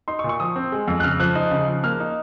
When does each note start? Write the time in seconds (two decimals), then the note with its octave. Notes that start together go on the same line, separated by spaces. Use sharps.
0.08 D#4 C6
0.19 C#6
0.24 A#2
0.29 C#6
0.40 F3 D#6
0.56 C4
0.72 G#3
0.88 F2
1.00 F#6
1.04 C#3 F6
1.20 F3 F#6
1.35 D#4
1.51 C#3
1.68 F3
1.83 A#3 F6
2.00 D#4